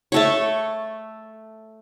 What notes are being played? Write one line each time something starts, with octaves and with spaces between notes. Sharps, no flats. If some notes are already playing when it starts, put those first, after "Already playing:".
A3 A4 C#5